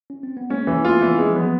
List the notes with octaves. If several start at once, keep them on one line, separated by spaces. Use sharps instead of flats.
C#4
C4
B3
G#3 A#3 C#4
E3
A3 B3 F4
E3 B3 C#4
C#4
G#3 A#3 C4
F3
E3 F#3 B3